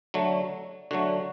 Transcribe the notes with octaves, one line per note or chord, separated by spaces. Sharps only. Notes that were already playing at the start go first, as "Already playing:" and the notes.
D3 F#3 A3
D3 F#3 A3 F#4